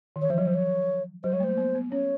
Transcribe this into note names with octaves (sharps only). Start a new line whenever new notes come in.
D#3
E3 C#5
F3 C5
F#3 C#5
F3 C5
C#5
F#3 C5
G3 C#5
A3
A#3 C5
B3
B3
C#4 C#5